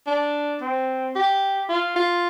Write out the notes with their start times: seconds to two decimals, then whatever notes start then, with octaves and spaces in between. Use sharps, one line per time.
0.07 D4
0.61 C4
1.15 G4
1.69 F4
1.96 F4